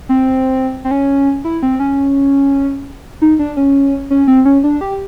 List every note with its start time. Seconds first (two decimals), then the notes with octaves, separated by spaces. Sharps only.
0.09 C4
0.85 C4
0.91 C#4
1.45 E4
1.63 C4
1.80 C#4
3.22 D#4
3.39 D4
3.57 C#4
4.10 C#4
4.27 C4
4.45 C#4
4.64 D4
4.81 G4